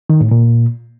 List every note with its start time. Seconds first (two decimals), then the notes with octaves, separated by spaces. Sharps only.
0.10 D#3
0.20 A2
0.31 A#2